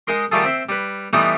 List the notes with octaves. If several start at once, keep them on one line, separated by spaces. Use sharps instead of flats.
G#3 D#4 A#4 C6
D#3 G3 A3 F4 G#4 A4
C4 E5 C6
G3 B4
E3 G3 A3 B3 D#4 E4